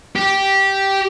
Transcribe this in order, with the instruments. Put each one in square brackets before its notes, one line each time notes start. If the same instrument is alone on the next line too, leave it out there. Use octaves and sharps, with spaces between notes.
[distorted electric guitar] G4